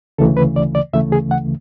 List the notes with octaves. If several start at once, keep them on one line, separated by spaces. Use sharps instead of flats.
D2 C#3 E3 A3 A4
B4
D5
D5
D2 C#3 E3 A3 E5
G#4
F#5